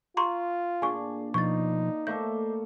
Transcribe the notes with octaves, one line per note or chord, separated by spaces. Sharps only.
F4 A#5 C6 C#6
A#2 D4 G#4 G#5 C#6
B2 F3 D#4 C#6 A6
A3 A#3 A4 C5 D#5 E5 G6